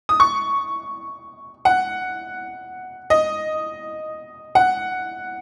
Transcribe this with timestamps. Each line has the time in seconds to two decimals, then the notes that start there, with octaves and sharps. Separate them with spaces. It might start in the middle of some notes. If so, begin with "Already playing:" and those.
0.09 D#6
0.20 C#6
1.65 F#5
3.10 D#5
4.55 F#5